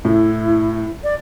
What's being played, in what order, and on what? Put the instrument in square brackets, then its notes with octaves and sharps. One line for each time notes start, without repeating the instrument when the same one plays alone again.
[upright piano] A2 [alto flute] E4
[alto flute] D5